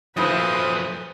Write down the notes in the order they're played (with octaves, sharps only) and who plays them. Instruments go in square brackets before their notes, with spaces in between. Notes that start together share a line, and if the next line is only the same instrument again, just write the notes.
[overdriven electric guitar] F#2 F3 [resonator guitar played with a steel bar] A#2 A3 E4 [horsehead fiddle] B4 C5 [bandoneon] D#6